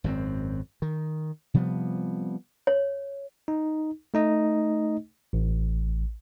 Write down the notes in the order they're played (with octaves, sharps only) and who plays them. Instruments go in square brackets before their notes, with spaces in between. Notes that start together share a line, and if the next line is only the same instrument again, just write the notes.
[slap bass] G#1 F#2 B2 C4
D#3
C3 F3 G3 B3
[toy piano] C#5
[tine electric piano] D#4
A3 D#4 D#5
A1